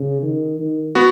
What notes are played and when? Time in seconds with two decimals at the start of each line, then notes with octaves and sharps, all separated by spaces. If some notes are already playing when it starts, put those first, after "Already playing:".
Already playing: C#3
0.22 D#3
0.59 D#3
0.95 B3 F#4